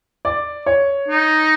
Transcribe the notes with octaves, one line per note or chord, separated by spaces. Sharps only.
D5
C#5
D#4